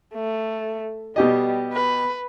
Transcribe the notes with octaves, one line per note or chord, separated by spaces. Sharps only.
A3
B2 G3 G4 D#5
B4